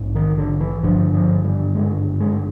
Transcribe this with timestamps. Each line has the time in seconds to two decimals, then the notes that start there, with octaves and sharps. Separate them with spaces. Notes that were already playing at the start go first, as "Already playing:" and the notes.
Already playing: A#1 G#2
0.15 D#3
0.38 D3
0.60 E3
0.83 G#1 G2 D3 F3
1.14 F3
1.44 G3
1.75 G#3
2.20 G#3